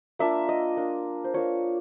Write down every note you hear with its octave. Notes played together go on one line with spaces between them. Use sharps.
A#3 D4 F4 E5
D#5
A#3 D4 F4
C5
A#3 D4 F4 C#5